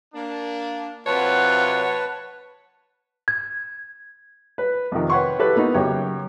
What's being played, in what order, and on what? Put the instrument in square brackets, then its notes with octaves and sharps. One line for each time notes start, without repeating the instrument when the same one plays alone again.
[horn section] A#3 D4
[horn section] C3 F#3 F4 [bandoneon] B4 A5 [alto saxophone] C#5 [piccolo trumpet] F#5
[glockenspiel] G#6
[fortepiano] B4
F2 C3 D#3
B4 C#5 F#5 G5 C6 C#6
E4 G4 A4 B4
A#3 B3 D#4 F#4
F#2 C#3 G4 C#5 G5